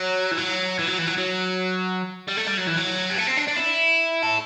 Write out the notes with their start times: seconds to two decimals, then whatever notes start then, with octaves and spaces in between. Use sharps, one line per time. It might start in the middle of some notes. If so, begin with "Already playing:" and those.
Already playing: F#3
0.31 E3
0.38 F#3
0.79 E3
0.88 F#3
0.99 E3
1.07 F#3
1.18 F#3
2.28 G3
2.37 A3
2.47 G3
2.58 F#3
2.67 E3
2.78 F#3
3.10 G3
3.18 A3
3.26 C4
3.37 D4
3.47 D4
3.56 E4
4.23 A4